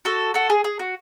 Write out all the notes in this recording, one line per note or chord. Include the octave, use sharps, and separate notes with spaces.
F#4 A4
F#4 A4
G#4
G#4
F#4